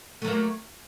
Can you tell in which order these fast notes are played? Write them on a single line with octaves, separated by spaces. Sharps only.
A3 F#3 A#3